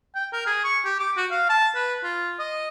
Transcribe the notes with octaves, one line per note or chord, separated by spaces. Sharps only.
G5
A#4
G#4
C#6
G4
D6
F#4
F5
A5
B4
F4
D#5